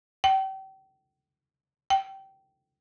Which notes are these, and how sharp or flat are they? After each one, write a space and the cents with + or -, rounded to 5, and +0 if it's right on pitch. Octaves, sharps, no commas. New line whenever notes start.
G5 -35
G5 -20